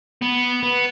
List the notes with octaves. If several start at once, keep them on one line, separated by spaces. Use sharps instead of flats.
B3
B3